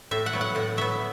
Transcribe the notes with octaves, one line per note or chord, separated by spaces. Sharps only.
A2 E5
F#5
F#3 B3
F#5
A2 F#5
F#3 B3 E5